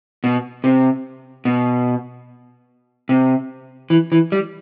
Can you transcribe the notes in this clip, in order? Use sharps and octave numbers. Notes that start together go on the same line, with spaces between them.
B2
C3
B2
C3
E3
E3
G3